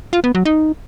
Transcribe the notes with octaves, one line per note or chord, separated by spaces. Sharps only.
F4
B3
F#3
D#4